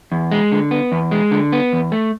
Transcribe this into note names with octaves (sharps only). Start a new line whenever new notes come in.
E2
G#3
D3
B3
E2
G#3
D3
B3
E2
A3